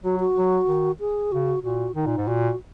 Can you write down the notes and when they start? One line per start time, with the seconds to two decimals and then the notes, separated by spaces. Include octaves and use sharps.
0.04 F#3 F#4
0.20 F#4
0.36 F#3
0.68 D#3
1.00 G#4
1.32 C#3 F#4
1.63 A#2 F#4
1.95 D#3 D#4
2.06 A#2
2.17 G#2
2.28 A#2 F#4